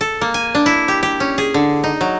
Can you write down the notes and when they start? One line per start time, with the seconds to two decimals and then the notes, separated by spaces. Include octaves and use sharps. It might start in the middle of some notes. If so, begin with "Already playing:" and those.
0.01 A4
0.21 A#3
0.34 G#5
0.55 D4
0.66 E4
0.88 G4
1.03 G4
1.20 C#4
1.38 G#4
1.54 D3
1.84 D#4
2.01 F#3